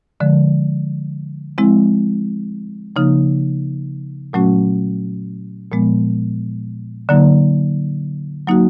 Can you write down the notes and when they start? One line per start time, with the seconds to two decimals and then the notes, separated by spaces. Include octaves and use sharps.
0.20 D3 F3 G#3
1.58 F3 G#3 C4 E4
2.96 C#3 F3 A#3 D#4
4.33 A#2 F#3 A3 C#4 F#4
5.72 A#2 F3 G#3 B3
7.09 D3 F#3 A#3 D#4
8.47 F#3 A#3 D#4 F#4